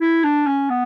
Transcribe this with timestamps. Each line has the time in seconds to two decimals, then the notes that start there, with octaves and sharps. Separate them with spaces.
0.01 E4
0.24 D4
0.47 C#4
0.70 B3